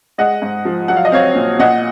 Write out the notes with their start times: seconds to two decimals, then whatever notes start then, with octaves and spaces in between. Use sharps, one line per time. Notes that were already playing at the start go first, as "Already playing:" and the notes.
0.18 G#3 D#5 F#5
0.42 G#2
0.65 F3
0.88 F#3 F#5
0.97 F5
1.05 D#5
1.12 C4 C#5 F5
1.35 A#2
1.59 A#2 D#5 F#5